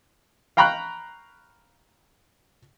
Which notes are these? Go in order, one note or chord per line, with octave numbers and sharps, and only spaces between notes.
F5 G5 A#5 B5 C#6 F#6